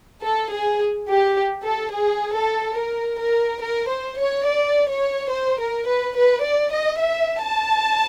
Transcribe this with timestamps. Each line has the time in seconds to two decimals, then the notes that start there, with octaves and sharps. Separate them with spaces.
0.25 A4
0.53 G#4
1.09 G4
1.65 A4
1.93 G#4
2.36 A4
2.79 A#4
3.21 A#4
3.63 A#4
3.91 C5
4.19 C#5
4.48 D5
4.90 C#5
5.32 C5
5.61 A#4
5.88 B4
6.17 B4
6.44 D5
6.73 D#5
7.01 E5
7.43 A5